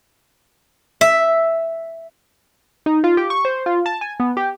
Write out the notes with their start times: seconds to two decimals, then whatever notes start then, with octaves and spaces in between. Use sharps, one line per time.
1.01 E5
2.86 D#4
3.04 F4
3.17 G4
3.30 C#6
3.45 C5
3.66 F4
3.86 A5
4.01 G#5
4.20 B3
4.37 G4